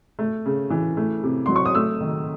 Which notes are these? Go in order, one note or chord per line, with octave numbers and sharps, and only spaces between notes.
A3
C#3
E3
A3
C3
F#3 C6
C#6
D#6
A3 E6
D#3